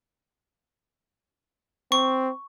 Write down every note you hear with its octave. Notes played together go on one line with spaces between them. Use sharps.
C4 C#6